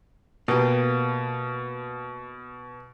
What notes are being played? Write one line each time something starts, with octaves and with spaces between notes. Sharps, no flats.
B2 A#3 B3 G4